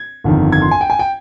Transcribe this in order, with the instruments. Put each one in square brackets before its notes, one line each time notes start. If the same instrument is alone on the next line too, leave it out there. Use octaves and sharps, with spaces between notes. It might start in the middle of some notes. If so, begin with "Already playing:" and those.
Already playing: [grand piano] G#6
G1 F2 D#3
G#6
C6
G#5
G5
G#5
G5